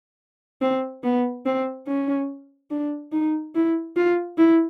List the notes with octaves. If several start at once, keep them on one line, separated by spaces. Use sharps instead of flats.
C4
B3
C4
C#4
D4
D#4
E4
F4
E4